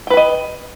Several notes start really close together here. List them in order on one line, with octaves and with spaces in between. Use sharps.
G5 B4 B5 D#5